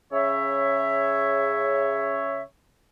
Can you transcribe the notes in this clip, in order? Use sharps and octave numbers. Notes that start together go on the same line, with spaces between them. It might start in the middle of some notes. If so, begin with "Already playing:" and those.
C#3 C#5 E5